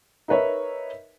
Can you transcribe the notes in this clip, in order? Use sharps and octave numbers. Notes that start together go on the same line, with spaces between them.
D#4 A#4 B4 C#5 E5